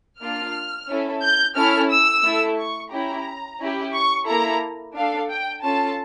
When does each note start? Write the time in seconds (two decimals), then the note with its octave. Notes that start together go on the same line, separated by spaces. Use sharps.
0.20 A#3 D4 F4 F6
0.88 C#4 E4 A4
1.23 G6
1.56 C#4 E4 A4 F6
1.90 E6
2.25 A3 E4 A4
2.59 C#6
2.92 C#4 E4 G4 A#5
3.60 C#4 E4 G4
3.94 C#6
4.27 A#3 E4 A4 A#5
4.95 D4 A4 F5
5.30 G5
5.63 C#4 F4 A4 A5